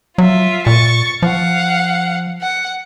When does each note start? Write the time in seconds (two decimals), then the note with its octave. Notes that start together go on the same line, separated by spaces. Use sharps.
0.18 F#3 F4 E5
0.66 A#2 C#6 A6
1.22 F3 F5 F#5
2.42 F#5